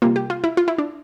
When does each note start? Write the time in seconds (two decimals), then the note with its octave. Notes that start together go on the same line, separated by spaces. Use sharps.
0.02 C3 G3 A#3 F4
0.16 G4
0.30 F4
0.44 E4
0.57 F4
0.68 E4
0.78 D4